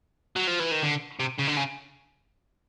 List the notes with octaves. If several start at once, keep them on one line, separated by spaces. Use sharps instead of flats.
F#3
F3
E3
D#3
D3
C3
C#3
D3
C#3